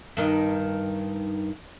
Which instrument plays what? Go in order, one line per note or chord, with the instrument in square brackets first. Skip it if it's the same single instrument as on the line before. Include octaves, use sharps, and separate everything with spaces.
[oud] G2 D#3 D#4